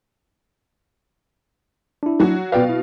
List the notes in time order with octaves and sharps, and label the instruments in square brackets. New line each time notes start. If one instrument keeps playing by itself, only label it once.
[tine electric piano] D4 E4
[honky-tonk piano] F#3 F#4
[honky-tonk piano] B2 F5 [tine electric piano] B4 D5 G5
[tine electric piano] E4